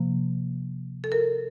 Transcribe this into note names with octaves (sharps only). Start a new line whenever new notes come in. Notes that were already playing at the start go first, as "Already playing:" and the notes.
Already playing: C3 F3 A#3
A4
A#4